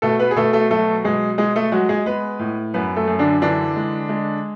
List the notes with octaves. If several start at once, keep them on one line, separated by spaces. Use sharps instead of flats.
B2 A3 A4
B3 B4
G#4
B2 A3 A4
A3 A4
F#3 A3 A4
B2 G#3 G#4
G#3 G#4
A3 A4
F#3 G#3 F#4
G#3 G#4
G#3 B3 B4
A2
F#2 B3 B4
A3 A4
F#2
D3 D4
D3 E3 D4
G#3
G#3